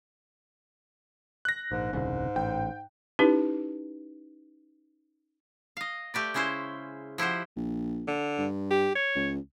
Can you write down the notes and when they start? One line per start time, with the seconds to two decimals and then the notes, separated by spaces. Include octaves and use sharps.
1.45 F#6 A#6
1.72 A#1 G#2
1.93 D#1 C2 G#2 C#3
2.36 A1 G5
3.19 C#4 D#4 E4 G4 B4
5.77 D#5 F5
6.14 A3 G4 B4 D5
6.34 C#3 G#3 C#4 E4 C5
7.18 F3 E4 G4 C5 F#5
7.56 A#1
8.07 D3
8.38 G2
8.71 G4
8.95 C#5
9.15 C#2